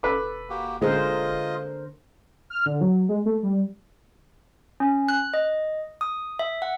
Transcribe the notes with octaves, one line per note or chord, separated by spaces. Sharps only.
E1 A4 B4 D6
A#3 F#4 G4
D3 G#3 F4 A#4 C5 D#5
F6
D3
F#3
G#3
A3
G3
C#4
F#6
D#5
D#6
E5
F#5